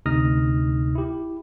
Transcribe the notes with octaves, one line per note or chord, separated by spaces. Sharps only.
D2 C3 D#4 D#6 F6 A#6
E4 G4